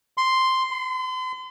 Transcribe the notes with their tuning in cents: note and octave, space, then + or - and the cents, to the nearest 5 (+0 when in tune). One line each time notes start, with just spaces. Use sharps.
C6 +0
C6 -40